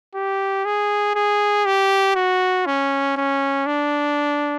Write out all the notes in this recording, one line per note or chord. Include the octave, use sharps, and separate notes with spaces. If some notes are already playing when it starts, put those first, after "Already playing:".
G4
G#4
G#4
G4
F#4
C#4
C#4
D4